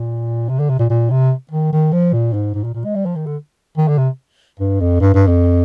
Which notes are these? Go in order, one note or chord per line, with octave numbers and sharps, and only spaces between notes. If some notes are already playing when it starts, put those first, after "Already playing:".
Already playing: A#2
C3
D3
C3
A#2
A#2
C3
D#3
D#3
F3
A#2
G#2
G#2
A#2
A#2
G#3
G3
F3
D#3
D3
D#3
D3
C3
G2
F2
G2
G2
F2